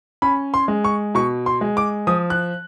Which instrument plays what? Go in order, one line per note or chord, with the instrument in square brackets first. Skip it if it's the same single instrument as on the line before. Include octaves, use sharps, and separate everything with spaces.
[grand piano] C#4 B5
C6
G#3
C#6
B2 C#6
C6
G#3
D6
F3 D#6
F#6